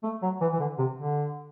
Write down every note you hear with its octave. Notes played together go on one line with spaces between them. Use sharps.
A3
F#3
E3
E3
D3
C3
D3